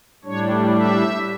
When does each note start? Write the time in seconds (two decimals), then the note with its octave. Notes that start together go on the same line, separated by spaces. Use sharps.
0.25 A2 G3 D4 C#5
0.74 E5